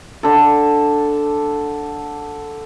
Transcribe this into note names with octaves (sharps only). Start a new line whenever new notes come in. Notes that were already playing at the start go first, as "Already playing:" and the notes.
D3 A4